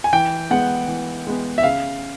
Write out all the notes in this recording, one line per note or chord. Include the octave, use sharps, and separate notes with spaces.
G#5
E3 G5
G#3 B3 F#5
E3
G#3 B3
E5
C#3 F5